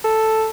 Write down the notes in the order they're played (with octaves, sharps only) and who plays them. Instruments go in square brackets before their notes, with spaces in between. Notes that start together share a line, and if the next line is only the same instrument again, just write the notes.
[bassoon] A4